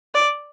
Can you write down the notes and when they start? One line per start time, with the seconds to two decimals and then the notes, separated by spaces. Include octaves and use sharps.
0.15 D5